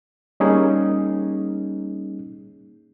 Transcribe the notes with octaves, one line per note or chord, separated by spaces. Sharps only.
G3 A#3 C#4 D#4 G#4